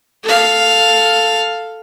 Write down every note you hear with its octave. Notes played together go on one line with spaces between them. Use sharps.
A4 F5